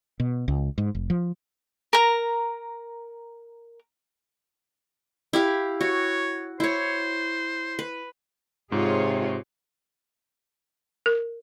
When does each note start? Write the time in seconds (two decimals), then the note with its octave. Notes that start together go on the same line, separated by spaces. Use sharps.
0.20 B2
0.48 C#2
0.78 G#2
0.95 F1
1.10 F3
1.93 A#4 A#5
5.33 E4 G4 F5
5.81 F#4 C#5
6.60 E4 C5 C#5
7.79 B4
8.72 G#2 C3 F4 G#4 C#5
11.06 A#4